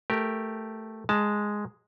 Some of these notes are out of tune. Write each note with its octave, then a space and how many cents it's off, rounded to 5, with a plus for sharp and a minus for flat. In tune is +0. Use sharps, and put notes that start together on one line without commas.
A3 +0 G4 +0 A#4 +0
G#3 +0 A5 +10